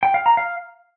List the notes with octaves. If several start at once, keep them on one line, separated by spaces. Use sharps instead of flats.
G5
F5
A#5
F5